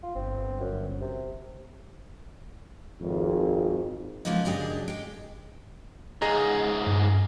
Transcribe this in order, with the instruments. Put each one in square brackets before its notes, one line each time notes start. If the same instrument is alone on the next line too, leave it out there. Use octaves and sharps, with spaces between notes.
[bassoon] F4
[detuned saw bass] G1 [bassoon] C4
[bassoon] F#2
C3
[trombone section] G#1 F2
[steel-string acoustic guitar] C#3 F3 G#3 A#3 B3 D#4
F#2 C#3 D4 G4 G#4 D#5
G#3 G4
[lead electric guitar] C#2 G#2 [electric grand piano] G#4 D#5 A#5
[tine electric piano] G2